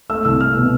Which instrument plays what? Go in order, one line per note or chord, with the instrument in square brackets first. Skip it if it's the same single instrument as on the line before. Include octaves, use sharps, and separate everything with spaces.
[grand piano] A3 E6
C2 E6
A3 F6
B2